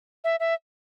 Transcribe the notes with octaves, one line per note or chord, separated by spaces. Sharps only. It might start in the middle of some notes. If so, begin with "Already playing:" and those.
E5
E5